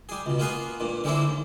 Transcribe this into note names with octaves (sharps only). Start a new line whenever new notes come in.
G3 G#4
C#2 B2
A#3 B3 F4 G#4 F#5 G#5
G2 A#2
D3 G3 G#3 A#3 C4 E4
D#2